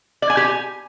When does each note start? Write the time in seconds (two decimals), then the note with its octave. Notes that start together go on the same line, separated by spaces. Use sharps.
0.22 D5
0.30 G#5
0.37 G4
0.45 G#5